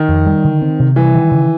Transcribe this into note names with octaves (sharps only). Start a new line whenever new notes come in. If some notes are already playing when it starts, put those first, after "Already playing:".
Already playing: D#3
F2
G3
D3
C4
C3
E3 G3
D#3
C#3